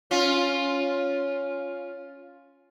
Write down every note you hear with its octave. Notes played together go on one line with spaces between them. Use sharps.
C#4 F4